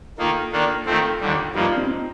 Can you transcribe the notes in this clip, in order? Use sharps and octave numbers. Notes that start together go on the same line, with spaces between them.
D#3 A#3 D#4 F4 A4
D#3 A#3 D4
D#3 A3 C4 F4 A4
D#2 D3 G3
G2 F3 A#3 D#4 G4
D4 F4
C4 D#4
C4 D#4